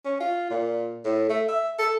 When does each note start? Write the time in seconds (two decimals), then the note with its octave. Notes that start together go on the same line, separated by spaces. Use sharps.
0.05 C#4
0.21 F4
0.50 A#2
1.05 A2
1.29 A3
1.49 E5
1.79 A4